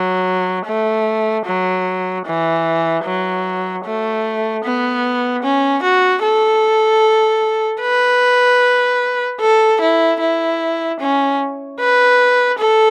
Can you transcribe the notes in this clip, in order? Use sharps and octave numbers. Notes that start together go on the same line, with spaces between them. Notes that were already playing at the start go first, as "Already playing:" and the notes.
Already playing: F#3
A3
F#3
E3
F#3
A3
B3
C#4
F#4
A4
B4
A4
E4
E4
C#4
B4
A4